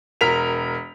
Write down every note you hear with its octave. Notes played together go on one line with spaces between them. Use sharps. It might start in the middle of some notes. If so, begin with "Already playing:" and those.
E1 A#4 B6 F7